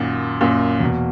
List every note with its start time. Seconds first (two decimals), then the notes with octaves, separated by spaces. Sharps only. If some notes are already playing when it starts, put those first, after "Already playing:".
Already playing: F#2 A#2 D#3 A#3 C#4 F#4
0.41 F#2 A#2
0.80 E2 B2 A#3